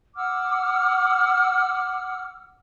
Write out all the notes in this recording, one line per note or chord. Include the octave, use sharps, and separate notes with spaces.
F#5 D6 E6 F6